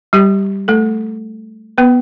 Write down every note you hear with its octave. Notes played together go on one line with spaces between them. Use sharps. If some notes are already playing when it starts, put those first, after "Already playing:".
G3 G4
A3 A4
B3 B4